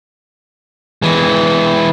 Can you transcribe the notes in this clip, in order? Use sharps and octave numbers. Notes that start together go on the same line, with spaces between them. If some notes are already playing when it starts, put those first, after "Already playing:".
E3 G#3